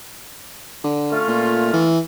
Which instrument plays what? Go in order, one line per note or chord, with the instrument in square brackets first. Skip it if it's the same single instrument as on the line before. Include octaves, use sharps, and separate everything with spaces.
[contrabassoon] D3
[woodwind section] A3 C#4 F4
[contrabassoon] A#2
E3